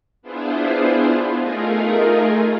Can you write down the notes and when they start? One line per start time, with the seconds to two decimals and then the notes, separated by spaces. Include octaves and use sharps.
0.22 B3 D4 E4 F4 G#4 C5
1.34 A3 D#4 F4 G#4 A#4